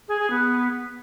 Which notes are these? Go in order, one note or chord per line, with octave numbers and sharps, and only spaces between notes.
G#4
G#4
B3